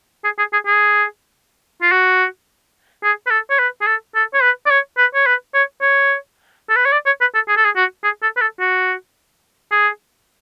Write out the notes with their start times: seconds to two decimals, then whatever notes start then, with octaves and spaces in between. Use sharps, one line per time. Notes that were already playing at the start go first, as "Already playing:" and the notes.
0.24 G#4
0.38 G#4
0.53 G#4
0.66 G#4
1.82 F4
1.92 F#4
3.03 G#4
3.27 B4
3.30 A4
3.50 C#5
3.59 B4
3.81 G#4
3.87 A4
4.15 A4
4.34 C#5
4.42 B4
4.66 D5
4.70 C#5
4.97 B4
5.14 C#5
5.26 B4
5.54 C#5
5.82 C#5
6.69 A4
6.76 B4
6.85 C#5
6.92 D5
7.06 C#5
7.21 B4
7.34 A4
7.48 G#4
7.57 A4
7.65 G#4
7.76 F#4
8.04 G#4
8.22 A4
8.37 B4
8.41 A4
8.60 F#4
9.71 G#4